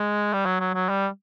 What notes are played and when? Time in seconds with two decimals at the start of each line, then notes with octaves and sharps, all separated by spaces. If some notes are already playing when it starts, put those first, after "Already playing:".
Already playing: G#3
0.33 G3
0.46 F#3
0.60 F#3
0.74 F#3
0.89 G3